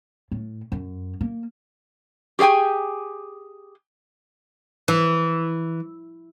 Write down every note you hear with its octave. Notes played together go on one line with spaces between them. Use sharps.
A2
F#2
A#3
G4 G#4 C#5 G5 G#5
E3